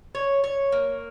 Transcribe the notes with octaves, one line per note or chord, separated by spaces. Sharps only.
C#5
C#5
A#3